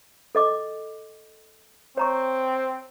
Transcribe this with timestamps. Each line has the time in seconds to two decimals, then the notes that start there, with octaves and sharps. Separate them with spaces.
0.35 A4 D#5 D6
1.97 C4 C#5 A#5 C#6